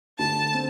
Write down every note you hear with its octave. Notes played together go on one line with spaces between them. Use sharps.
D2 A5
C4